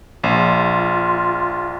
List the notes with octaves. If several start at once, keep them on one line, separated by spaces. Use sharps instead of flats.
A#1 F4